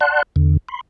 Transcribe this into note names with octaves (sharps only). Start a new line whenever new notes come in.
D5 F#5 A5 C6 F#6
E2 D3
B5 C6